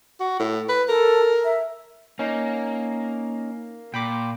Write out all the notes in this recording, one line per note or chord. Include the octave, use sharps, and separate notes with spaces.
F#4
A2
B4
A4 A#4
E5
A#3 C#4 D#4
A#2 G5 B5 D6